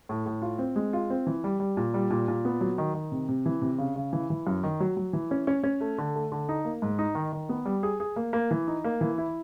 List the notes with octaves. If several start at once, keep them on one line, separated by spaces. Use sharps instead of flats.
A2
A2
F4
C4
G#3
F4
C4
E3
G3
G3
A#2
G3
A#2
A#2
B3
F#3
D#3
D#3
C3
C3
E3
C3
C#3
C#3
E3
E3
F#2
D#3
F#3
F#3
E3
C#4
C#4
C#4
A3
D3
A3
D3
D#4
A#3
G#2
D#4
D#3
D#3
B3
G3
G#4
G#4
A#3
A#3
E3
D#4
A#3
E3
E4